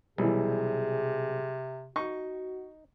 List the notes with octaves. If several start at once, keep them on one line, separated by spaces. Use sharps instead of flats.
B1 C3 E3 F#3 G3 G#4
D#4 F#4 C#6